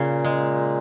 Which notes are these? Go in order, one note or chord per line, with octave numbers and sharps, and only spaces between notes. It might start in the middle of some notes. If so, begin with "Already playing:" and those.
Already playing: A#2 C#3
G#3